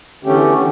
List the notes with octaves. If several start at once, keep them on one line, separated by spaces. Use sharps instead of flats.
E2 D3 A3 C#4 G4